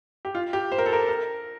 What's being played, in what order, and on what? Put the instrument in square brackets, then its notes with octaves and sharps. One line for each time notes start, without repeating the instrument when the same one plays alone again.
[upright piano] G4
F4
G4
C5
A#4
A4
A#4
A#4